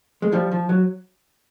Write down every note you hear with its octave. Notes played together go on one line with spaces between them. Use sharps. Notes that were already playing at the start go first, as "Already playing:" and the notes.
G#3
F3 G3
F3
F#3